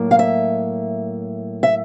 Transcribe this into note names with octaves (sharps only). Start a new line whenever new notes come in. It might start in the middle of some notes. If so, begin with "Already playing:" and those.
Already playing: A2 F#3 A#3
F5
E5
E5